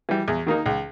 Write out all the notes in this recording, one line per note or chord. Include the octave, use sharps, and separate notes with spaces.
E3 G3
E2
D#3 A#3 D#4
C#2